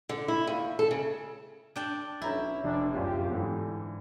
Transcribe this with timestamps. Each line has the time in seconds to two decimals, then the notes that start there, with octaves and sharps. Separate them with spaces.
0.09 D3
0.28 E4
0.47 D#2
0.79 A4
0.91 C#3
1.76 D4 G5 A5
2.22 B1 C#4 E4 A#5 G6
2.64 F1 D4
2.94 D1 F#2 C3 F4 G4
3.31 G#2 D3 E3